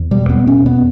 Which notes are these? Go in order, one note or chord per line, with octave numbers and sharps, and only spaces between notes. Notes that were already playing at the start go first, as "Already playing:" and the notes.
Already playing: E2
B2 G3
E2 B3
B2 C#4
E2 B3